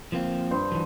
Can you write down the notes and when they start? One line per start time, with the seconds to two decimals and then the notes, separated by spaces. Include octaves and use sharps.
0.12 F3 A#3 C4
0.51 G2 C5
0.72 E3 F#3